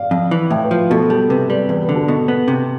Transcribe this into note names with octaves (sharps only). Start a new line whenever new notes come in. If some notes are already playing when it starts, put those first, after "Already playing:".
Already playing: D5 F5
F2
E3
A2 E5 G5
B4
F3
B4
B2 A4
G3 A4
C3 B4
G3 B4
E2 B4
B4
D3
A4
B2
B3
C3